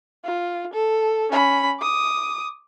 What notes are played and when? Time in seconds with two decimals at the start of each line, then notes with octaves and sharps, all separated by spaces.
0.24 F4
0.73 A4
1.31 C#4 B5
1.80 D6 D#6